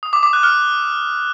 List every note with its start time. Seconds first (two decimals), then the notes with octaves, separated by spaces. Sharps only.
0.03 D#6
0.13 D6
0.23 D6
0.33 F#6
0.43 F6